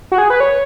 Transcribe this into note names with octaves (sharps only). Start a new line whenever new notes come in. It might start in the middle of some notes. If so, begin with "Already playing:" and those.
F#4
G#4
B4
C#5